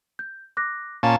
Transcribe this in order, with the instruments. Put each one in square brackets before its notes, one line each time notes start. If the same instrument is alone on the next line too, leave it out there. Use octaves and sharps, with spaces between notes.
[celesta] G6
D6 F#6 A#6
[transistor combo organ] A#2 C#4 A5 [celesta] F5 A#5